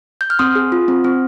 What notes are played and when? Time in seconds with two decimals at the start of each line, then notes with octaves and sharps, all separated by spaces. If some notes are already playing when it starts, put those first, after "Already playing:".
0.21 G6
0.30 F6
0.39 C4 C6 D#6
0.56 G#4
0.72 F4
0.88 C4
1.04 C4